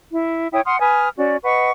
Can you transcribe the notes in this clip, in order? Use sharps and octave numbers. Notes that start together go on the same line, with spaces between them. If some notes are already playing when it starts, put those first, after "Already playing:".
E4
E4 C#5 G5 D#6
F#5 C6 D#6 F6
B4 G#5 D#6 F6
C#4 F#4 D5
B4 D#5 F#5 C#6